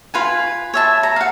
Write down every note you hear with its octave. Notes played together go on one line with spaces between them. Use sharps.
F4 B4 G#5
C#5 E5 A5
A#5
F5 F#5